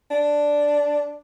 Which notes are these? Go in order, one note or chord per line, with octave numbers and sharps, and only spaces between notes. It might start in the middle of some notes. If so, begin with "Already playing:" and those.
D4